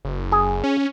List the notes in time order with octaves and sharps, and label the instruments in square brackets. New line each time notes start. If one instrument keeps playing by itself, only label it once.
[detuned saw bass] F#1
[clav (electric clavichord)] G#4
[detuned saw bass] C#4